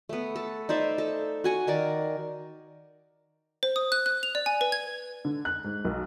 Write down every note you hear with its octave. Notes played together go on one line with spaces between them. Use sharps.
A3 B3
A4
D#4 C5 D5 E5
A4
F#4 G#5 C#6
D#3 A#4 D5
C5
D#6
F#6
F#6
F7
D5
G#5
B4
G#6
D3
F#6
G#2
B1